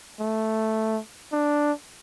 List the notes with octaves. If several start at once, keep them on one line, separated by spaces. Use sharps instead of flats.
A3
D4